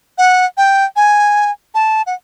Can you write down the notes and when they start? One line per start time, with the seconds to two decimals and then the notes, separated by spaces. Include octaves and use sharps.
0.18 F#5
0.57 G5
0.96 G#5
1.75 A5
2.07 F#5